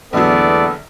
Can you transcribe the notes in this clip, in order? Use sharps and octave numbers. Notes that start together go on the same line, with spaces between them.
A#1 E2 D3 F#3 A3 B3 A4 D5